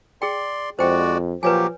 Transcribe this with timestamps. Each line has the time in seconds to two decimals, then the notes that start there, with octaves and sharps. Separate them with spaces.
0.22 G#4 D5 G5 C6
0.79 F2 G#3 F#4 C5 D5 G5
1.43 A#2 F3 F#3 G4 B4 C#5 G#5